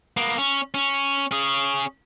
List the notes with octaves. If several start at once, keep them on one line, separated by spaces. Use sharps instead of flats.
A#3 B3
C#4
C#4
C#4 G#4